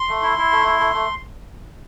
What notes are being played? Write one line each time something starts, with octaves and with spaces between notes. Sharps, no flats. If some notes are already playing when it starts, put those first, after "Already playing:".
Already playing: C6
A3
E4
E4
A3
E4
A3
A3